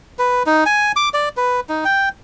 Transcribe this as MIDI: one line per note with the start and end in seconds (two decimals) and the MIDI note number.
0.19 0.43 71
0.46 0.64 63
0.66 0.92 80
0.96 1.09 86
1.14 1.29 74
1.37 1.60 71
1.69 1.84 63
1.85 2.09 79